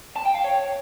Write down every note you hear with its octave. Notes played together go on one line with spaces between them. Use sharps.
A5
G5
F5
C#5